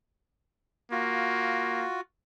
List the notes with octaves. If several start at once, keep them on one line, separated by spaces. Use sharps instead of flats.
A#3 F4 F#4